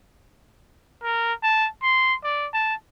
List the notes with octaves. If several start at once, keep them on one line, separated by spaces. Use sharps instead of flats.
A#4
A5
C6
D5
A5